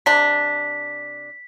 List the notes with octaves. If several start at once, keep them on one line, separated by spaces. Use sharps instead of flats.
C3 D4 B6